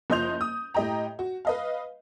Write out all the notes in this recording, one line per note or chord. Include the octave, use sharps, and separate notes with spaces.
F#1 F3 D#5 C6 G6 F7
D#6
A2 G4 D#5 G5 A#5
F#4
B4 D#5 F5